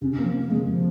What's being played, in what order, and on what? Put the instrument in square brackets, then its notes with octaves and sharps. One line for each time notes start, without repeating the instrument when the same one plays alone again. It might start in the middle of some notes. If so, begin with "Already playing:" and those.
[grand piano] C3 [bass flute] C#4
[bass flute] C#4
[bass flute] F3 [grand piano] A#3
[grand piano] F3
[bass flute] A#3
[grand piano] C3 [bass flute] G#3
[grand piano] C3 [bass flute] F3